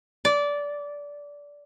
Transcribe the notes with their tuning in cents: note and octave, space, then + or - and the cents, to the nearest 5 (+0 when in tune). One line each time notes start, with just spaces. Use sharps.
D5 -20